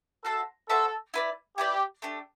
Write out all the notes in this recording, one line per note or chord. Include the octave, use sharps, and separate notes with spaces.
F#4 A4 C5 E5 A5
F#4 A4 C5 E5 A5
E4 B4 D5
E4 G4 B4 D5
A3 D4 G4